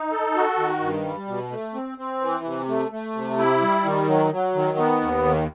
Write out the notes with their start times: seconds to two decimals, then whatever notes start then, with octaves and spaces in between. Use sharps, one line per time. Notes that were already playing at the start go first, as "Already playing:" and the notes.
Already playing: D#4
0.11 A4
0.34 F#4
0.58 D#3
0.81 G2
1.04 G3
1.28 B2
1.51 A3
1.74 C4
1.98 C4
2.21 E3
2.44 C3
2.68 A3
2.92 A3
3.15 C3
3.38 E4
3.61 G3
3.85 D#3
4.08 F#3
4.32 F#3
4.55 D#3
4.78 B3
5.01 D#2
5.25 D#3